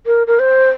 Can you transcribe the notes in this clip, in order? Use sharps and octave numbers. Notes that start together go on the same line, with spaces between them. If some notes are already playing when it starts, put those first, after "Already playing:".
A#4
A#4
C5